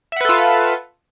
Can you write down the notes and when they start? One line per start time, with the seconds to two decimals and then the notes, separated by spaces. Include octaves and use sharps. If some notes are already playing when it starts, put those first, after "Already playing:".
0.12 E5
0.16 F#5
0.21 B4
0.25 A4
0.29 F4